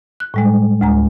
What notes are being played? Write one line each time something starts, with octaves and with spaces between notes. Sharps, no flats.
F#6
A2 G3 G#3
D2 G#3 A#5